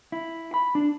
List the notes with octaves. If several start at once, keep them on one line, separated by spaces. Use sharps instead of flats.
E4
B5
D4